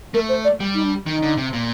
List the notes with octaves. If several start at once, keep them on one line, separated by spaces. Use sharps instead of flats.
A3 A#4
C5
D5
G3
D#4
D4
D#3 D#4
D3
C3
A#2